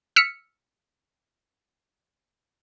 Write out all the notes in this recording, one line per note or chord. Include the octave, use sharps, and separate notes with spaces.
E6 F6 B6 C#7